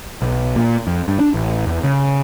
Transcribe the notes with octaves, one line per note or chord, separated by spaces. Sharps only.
B1
A#2
F2
G2
D4
A1
E2
C#3